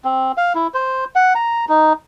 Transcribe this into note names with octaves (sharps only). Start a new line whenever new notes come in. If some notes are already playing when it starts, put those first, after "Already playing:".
C4
F5
E4
C5
F#5
A#5
D#4